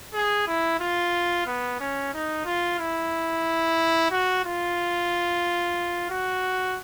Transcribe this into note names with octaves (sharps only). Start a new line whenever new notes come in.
G#4
E4
F4
B3
C#4
D#4
F4
E4
F#4
F4
F#4